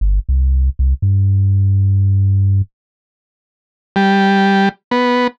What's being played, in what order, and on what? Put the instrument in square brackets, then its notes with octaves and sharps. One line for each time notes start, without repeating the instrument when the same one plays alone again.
[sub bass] G1
C2
C2
G2
[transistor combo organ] G3
B3